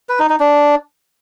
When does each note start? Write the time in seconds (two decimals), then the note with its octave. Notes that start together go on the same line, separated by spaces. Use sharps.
0.09 B4
0.19 D#4
0.29 D#4
0.40 D4